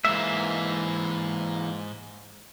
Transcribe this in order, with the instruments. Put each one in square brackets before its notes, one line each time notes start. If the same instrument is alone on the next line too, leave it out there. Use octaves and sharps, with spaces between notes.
[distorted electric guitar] G#2 [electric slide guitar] E3 A#3 [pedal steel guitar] E5